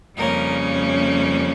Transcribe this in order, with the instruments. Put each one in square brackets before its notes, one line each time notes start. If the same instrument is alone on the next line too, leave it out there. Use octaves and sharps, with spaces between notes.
[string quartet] F2 C#3 G3 A#3 C#4 A#4